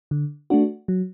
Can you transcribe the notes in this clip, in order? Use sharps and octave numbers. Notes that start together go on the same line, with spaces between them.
D3
A3 D4 F#4
F#3